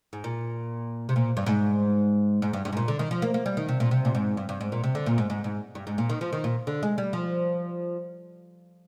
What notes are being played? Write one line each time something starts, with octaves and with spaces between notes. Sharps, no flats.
G#2
A#2
C3
A#2
G2
G#2
G#2
G2
G2
G#2
A#2
D3
D#3
F3
A#3
A#3
G3
D#3
C3
A#2
C3
A#2
G#2
G2
G2
G#2
A#2
C3
D3
A#2
G#2
G#2
G#2
G2
G#2
A#2
D#3
F3
D#3
A#2
D3
G#3
G3
F3